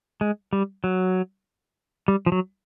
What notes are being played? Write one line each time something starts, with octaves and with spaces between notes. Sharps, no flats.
G#3
G3
F#3
G3
F3
F#3